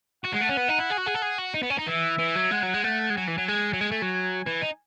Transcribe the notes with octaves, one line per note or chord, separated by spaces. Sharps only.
F#4 F#5
G#3
A3
C#4
B3
D#4
E4
G#4
F#4
G#4
A4
G#4
F#4
D#4
B3
C#4
D#4
E3 E5
E3
F#3
G#3 F#5
F#3
G#3
A3 F#5
G#3
F#3 G#5
E3
F#3
G#3 G#5
F#3
G#3
A3
F#3
E3
D#4